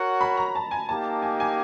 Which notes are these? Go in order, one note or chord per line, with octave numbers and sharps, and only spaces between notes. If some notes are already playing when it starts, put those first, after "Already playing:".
Already playing: F#4 A#4 C#5 F#5
B5
A#5
A5
G#5
A#3 D#4 G4 A5
G#5
G#5